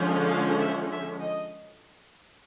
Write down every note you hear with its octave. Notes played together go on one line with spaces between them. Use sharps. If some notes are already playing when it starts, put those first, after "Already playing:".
Already playing: D3 F3 G#3 C#4
F5
E5
E5
D#5